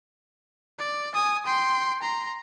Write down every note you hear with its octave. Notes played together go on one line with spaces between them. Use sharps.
D5
G#5 D#6
G5 C6
A#5 C6